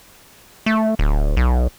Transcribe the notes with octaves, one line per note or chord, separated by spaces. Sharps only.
A3
D1
B1